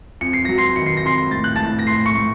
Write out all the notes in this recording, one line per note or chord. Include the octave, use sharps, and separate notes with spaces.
F2 C#7
C7
F#3 A#6
C6 C7
D#3 C#7
C7
A#6
F2 C6 C7
A2 A6
F#6
A2 A5 A6
A#6
A2 C6 C7
C#6 C#7
A2